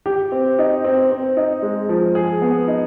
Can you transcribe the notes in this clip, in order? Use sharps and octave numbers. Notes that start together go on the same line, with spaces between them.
G4
C4
D#4
C4
C4
D#4
G#3
F3
G#4
B3
D#4